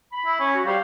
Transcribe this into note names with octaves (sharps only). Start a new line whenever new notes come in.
B5
E4
C#4
F#4
G3 G4 C5 F5